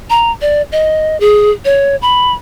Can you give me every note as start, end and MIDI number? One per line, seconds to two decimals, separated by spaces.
0.10 0.31 82
0.41 0.62 74
0.72 1.17 75
1.20 1.51 68
1.65 1.96 73
2.02 2.33 83